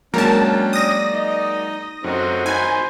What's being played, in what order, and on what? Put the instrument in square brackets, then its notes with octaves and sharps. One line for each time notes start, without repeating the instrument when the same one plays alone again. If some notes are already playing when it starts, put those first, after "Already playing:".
[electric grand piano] F#3 G#3 A#3 [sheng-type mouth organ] C#4 D4 G5 [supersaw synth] A#4 A5
[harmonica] D5 [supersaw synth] D#6 A#6
[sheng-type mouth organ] D#4 D#5
[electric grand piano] F#2 [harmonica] A3 C4 D#4 [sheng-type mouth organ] F#4
[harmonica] D#4 C5 B5 [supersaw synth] G#5